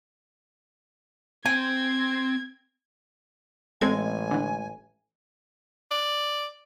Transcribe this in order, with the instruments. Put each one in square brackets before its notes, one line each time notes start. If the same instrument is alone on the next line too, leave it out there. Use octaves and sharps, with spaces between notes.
[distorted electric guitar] C4 G5 [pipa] G#5 [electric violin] G#6
[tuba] A1 [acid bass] G#3 [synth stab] C4 A4 G#6 [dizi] G#5
[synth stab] D3 E3
[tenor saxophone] D5